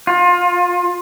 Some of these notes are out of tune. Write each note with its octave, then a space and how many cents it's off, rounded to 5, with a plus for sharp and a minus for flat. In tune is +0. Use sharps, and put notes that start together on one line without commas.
F4 +25